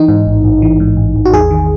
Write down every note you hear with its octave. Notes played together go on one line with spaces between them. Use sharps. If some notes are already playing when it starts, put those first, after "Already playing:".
Already playing: E3 D#4
G#2
A1
A1
E3
G#2
A1
A1
F#4
E2 G#4
D#3